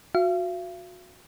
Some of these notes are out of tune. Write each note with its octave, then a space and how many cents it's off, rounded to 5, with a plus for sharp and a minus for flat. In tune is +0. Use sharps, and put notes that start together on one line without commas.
F#4 -25 F5 -45